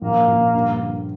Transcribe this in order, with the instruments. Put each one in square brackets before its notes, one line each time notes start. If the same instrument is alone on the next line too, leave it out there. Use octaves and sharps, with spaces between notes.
[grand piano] A#1 [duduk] A#3
[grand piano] A#2
G2
D3